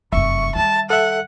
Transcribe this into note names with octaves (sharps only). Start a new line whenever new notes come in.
F1 F#2 E5 C#6
D#3 G3 A5
A4 E5 F#5